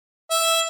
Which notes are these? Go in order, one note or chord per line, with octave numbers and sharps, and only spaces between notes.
E5